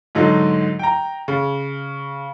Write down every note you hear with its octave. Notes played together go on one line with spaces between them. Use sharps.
G#2 D3 F#3 D#4
G5 A#5
C#3